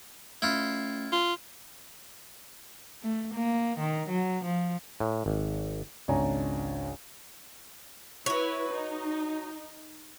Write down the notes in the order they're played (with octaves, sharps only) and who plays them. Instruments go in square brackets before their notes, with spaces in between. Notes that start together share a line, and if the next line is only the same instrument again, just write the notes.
[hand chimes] A3 C#4 C7 [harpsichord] E4 F4
[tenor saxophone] F4
[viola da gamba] A3
A#3
D#3
F#3
F3
[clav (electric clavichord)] A2
G#1
[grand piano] G#1 C#2 D4 C#5 G#5 A#5
[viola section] E4 B4 [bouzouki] F#4 C#5
[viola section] D#4